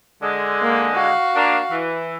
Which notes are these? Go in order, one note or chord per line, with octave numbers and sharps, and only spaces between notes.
D3 G#3
A#3
F#4 F5
A#3 D4
E3